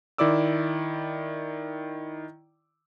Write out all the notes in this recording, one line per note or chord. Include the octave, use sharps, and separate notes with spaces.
D#3 E4 D5 D6 E6